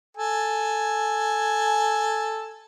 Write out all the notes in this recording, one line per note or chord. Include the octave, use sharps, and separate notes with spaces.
A4 G#5